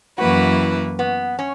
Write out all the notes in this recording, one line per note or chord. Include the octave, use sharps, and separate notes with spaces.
F#2 E3 A#3 E4 F#4 B4
B3
C#4